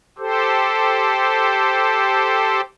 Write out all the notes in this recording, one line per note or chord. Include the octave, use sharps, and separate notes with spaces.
G4 A4 C5